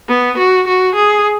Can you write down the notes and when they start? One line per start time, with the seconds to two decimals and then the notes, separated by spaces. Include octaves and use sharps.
0.08 B3
0.37 F#4
0.67 F#4
0.95 G#4